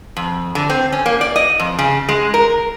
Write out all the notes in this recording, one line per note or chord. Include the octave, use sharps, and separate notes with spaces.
F2
D3
C4
C#4
A#3
D5
D#5
F2
C#3
G#3
A#4